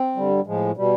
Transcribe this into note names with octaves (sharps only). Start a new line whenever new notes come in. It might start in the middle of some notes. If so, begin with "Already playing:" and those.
Already playing: C4
G2 D3 G3
A2 F3 G#3
B2 G3